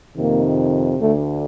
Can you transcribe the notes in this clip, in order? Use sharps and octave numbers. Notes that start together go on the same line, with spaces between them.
F2 C3 D#3 A#3
D2 D3 A3